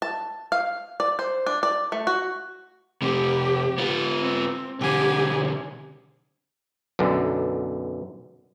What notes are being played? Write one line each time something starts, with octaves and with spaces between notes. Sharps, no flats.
A5
F5
D5
C5
D4
D5
A3
F#4
F2 C3 G4
B3 F4
C4
B1 D3 G4 G#5
B1 F#2 D3